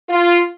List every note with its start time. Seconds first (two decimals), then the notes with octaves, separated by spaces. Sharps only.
0.09 F4